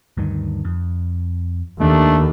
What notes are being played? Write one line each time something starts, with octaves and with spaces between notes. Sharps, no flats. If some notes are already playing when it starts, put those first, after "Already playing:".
D2 G2 D#3
F2
D#2 D#3 A3 A#3 D4